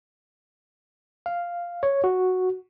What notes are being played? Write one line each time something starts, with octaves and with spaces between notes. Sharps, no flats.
F5
C#5
F#4